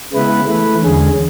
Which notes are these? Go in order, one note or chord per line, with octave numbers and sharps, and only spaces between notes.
C#3 G#3 B3 E4 B4
E3 A3 E4 B4
E2 D3 G#3 C#4 G#4